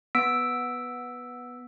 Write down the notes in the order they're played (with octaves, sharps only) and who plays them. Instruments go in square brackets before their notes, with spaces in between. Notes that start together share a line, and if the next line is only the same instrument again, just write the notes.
[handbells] B3 E6 B6 D7